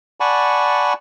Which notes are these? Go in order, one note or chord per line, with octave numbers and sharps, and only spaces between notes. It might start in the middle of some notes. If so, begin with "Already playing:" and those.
D5 F#5 G#5 A5 B5 C#6